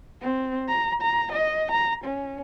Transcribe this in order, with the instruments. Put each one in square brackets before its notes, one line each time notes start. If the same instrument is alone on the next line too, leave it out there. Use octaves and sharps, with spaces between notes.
[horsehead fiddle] C4
A#5
A#5
D#5
A#5
C#4